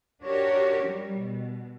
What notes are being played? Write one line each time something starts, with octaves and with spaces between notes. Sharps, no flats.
D4 F#4 G4 A#4 C#5
F#3 G3
B2